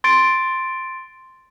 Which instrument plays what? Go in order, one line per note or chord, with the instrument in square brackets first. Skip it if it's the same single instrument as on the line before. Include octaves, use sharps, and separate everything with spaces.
[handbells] C6 A6 D7